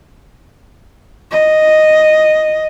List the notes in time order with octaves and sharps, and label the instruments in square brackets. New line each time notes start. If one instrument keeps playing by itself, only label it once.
[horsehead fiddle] D#5